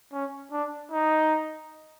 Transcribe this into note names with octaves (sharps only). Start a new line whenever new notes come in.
C#4
D4
D#4